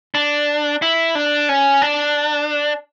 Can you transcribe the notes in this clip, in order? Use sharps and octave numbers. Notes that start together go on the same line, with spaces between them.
D4
E4
D4
C#4
D4